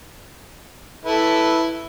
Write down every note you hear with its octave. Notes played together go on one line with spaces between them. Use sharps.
E4 A4 B4